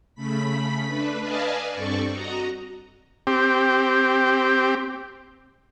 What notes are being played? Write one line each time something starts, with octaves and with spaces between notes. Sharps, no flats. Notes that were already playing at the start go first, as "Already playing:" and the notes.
C#3 A3 B5 B6
A3 D4 B4
B4 D5 D#5 F5 G#5 A5
G2 C4 A4 D5 C#6
F#4 D#5 A#5
C4 G4